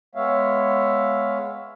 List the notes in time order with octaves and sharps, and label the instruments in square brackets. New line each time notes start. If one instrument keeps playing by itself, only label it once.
[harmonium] G#3 B3 C#5 E5 F5